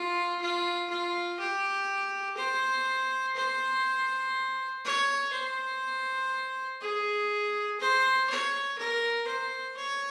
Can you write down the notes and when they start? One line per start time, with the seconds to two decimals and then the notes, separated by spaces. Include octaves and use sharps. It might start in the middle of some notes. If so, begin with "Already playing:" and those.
Already playing: F4
0.41 F4
0.90 F4
1.39 G4
2.37 C5
3.36 C5
4.84 C#5
5.33 C5
6.80 G#4
7.80 C5
8.29 C#5
8.78 A#4
9.27 C5
9.76 C#5